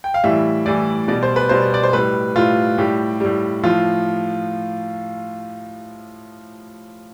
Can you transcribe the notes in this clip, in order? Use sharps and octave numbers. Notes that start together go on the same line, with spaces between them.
G5
F5
A2 E3 G3 E5
A2 E3 G3 D5
B2 G3 D5
C5
B4
B2 G3 C5
D5
C5
A2 G3 B4
A2 G3 F4
A2 G3 G4
A2 G3
A2 F3 F4